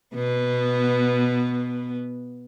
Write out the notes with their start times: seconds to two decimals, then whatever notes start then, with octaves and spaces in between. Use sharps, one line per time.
0.15 B2 B3